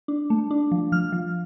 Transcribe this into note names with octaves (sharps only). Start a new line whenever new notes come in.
D4
A3
D4
F3
F3 F6
F3